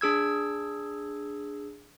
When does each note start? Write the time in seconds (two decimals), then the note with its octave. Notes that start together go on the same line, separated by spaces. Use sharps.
0.01 D4 G#4 E6 G#6